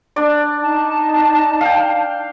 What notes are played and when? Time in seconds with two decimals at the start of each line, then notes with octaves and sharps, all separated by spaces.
0.16 D4 D5
0.60 D#4 A5
1.61 F5 G5